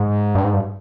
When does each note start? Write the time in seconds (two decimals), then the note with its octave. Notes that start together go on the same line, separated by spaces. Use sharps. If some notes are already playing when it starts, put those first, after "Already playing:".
Already playing: G#2
0.35 G2
0.44 G#2
0.54 G2